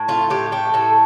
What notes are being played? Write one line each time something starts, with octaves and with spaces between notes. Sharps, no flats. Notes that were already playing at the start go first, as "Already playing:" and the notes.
Already playing: A2
A3 F4
A2 G4
A3 G4
A2 A4